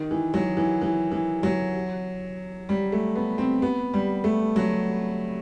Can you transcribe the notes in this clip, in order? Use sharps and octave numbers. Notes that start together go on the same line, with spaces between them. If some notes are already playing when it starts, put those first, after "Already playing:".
Already playing: D#3
E3
F#3
E3
E3
E3
F#3
G3
A3
B3
C4
B3
G3
A3
F#3